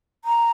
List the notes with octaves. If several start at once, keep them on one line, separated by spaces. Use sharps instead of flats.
A#5